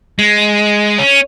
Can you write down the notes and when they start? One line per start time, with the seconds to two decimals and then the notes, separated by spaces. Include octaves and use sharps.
0.19 G#3
0.98 C#4